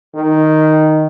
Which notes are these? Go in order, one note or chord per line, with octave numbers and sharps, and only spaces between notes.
D#3